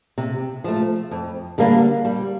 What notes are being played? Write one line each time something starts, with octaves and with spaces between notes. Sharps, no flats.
C3
F3 A3
F2
D3 G3 A#3 D4
G3